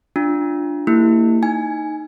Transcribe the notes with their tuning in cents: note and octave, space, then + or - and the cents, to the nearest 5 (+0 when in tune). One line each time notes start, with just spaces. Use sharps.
D4 +0 F4 +0
A#3 -40 E4 +0 G4 +0
D#4 -5 G#5 +0